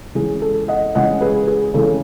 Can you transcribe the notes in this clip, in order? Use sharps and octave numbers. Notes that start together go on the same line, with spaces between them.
C#3 E3 G#3 G#4
A4
D#5 F#5
C#3 E3 G#3 D#5 F#5
G#4 B4
G#4
C#3 E3 G#3 A4